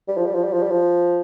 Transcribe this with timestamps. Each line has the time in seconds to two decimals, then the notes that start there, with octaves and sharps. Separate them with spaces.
0.08 G3
0.17 F3
0.26 G3
0.35 F3
0.45 G3
0.53 F3
0.63 G3
0.71 F3